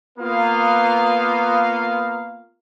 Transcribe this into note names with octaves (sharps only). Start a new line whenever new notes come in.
A#3 B3 F4 F5